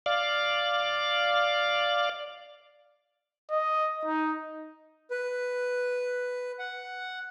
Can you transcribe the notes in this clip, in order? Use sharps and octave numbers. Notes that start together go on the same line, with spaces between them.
D5 F5
D#5
D#4
B4
F#5